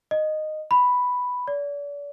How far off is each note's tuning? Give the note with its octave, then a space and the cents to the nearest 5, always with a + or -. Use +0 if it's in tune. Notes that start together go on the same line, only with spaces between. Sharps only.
D#5 -10
B5 +0
D5 -40